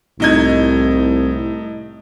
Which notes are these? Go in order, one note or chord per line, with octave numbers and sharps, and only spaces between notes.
C2 A2 D#4 G#6